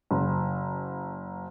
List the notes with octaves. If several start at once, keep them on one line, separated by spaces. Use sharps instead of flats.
F#1